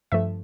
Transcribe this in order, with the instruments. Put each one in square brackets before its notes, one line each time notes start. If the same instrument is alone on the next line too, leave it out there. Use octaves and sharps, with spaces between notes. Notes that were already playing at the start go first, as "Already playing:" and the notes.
[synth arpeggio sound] G2 F3 A3 E5